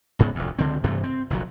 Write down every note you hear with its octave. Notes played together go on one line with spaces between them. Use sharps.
C#2 G#2 C#3 B3
F1 D2
C#2 D3 C4
G2 C3 E3 A3
C4
F#1 B1 F3 F#3